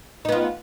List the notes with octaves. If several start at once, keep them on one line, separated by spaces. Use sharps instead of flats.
B3 D#4 F4